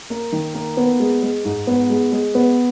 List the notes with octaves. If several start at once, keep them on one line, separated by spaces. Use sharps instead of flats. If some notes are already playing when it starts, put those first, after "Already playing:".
A#3
D#3
A#3
B3
G#3
G#3
G#2
B3
G#3
G#3
B3